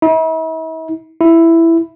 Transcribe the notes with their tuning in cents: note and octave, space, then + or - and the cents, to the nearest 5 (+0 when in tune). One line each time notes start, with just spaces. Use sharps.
E4 -45
E4 +5